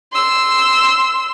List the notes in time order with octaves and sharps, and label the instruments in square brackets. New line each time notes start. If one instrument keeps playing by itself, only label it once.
[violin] C6 E6